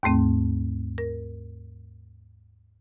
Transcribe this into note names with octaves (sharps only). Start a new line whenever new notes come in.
D#2 G#2 A3 C4
A#4